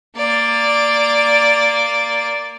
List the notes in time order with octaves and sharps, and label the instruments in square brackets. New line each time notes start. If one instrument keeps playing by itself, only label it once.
[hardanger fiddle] A#3 D5